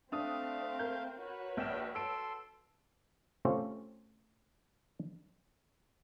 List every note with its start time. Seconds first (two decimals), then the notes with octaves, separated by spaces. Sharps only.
0.12 A3 C4 D4 F5 D#6
0.79 A#4 G6
1.19 F#4 B4 C#5
1.57 A#1 G5 E7
1.95 A4 C6 E6 D7
3.45 A3 C4 C#4 F4 G4 C5